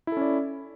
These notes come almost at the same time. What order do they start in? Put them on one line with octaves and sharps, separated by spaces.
E4 A4 C#4 D5